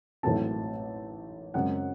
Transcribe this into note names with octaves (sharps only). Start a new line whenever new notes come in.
A1 G#2 F#3 A3 C4 A5
F#2 C#3 G#3 C4 F#5